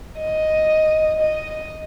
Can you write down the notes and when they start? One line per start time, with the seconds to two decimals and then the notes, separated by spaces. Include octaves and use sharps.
0.19 D#5
1.20 D#5